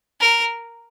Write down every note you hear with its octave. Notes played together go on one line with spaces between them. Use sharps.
A#4